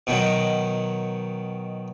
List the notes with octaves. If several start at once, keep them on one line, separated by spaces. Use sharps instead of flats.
B2 D#3 F#3